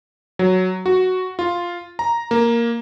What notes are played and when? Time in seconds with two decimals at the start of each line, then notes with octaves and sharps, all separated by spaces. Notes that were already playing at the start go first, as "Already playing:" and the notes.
0.39 F#3
0.86 F#4
1.39 F4
1.99 A#5
2.31 A#3